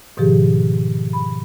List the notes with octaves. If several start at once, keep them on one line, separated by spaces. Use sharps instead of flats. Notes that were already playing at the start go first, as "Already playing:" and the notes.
G#2 B2 D#3 F3 G4 G#4
B5